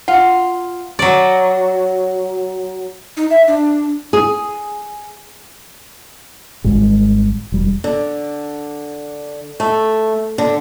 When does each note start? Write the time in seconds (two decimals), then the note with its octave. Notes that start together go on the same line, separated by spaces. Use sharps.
0.08 F4 F#5
0.99 F#3 D5
3.17 D#4
3.31 E5
3.47 D4
4.13 G#4
6.64 G#1 G#2 G3 G#3
7.52 E1 G3
7.84 D3
9.60 A3
10.38 D3